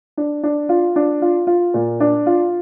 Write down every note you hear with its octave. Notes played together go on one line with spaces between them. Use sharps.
D4
D4
F4
D4
F4
F4
A#2
D4
F4